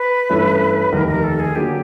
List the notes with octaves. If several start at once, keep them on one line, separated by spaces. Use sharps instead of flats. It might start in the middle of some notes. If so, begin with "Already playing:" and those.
Already playing: B4
G2 E3 A3 C#4 E4
F1 D#2 D#3 A#4
A#4
A4
G#4
D3 F#3 A#3 G4